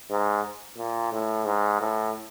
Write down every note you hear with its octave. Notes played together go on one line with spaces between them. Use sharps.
G#2
A#2
A2
G#2
A2